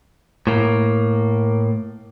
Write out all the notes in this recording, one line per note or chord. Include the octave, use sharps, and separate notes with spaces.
A2 A#3